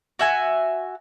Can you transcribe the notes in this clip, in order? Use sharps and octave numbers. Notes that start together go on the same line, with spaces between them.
F#4 E5 G#5